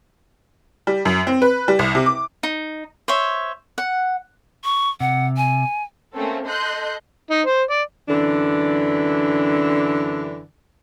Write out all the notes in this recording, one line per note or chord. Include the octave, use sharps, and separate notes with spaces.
G3
F#2
C4
B4
G3
C2
C3
D6
D#4
C5 C#5 E5
F#5
C#6
C3 F#5
G#5
A3 A#3 C4 C#4 A4
A4 D#5 C6 F#6 G6
D#4
C5
D5
F#2 D3 E3 D4